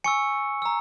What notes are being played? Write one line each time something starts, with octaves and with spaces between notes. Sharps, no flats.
G#5 C#6 E6 C#7
A#5 E6